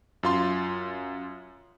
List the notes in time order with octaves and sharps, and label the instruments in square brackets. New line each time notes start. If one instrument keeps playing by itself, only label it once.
[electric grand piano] F#2 F4 C6